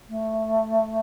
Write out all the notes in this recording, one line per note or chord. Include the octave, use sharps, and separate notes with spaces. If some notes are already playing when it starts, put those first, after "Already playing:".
A3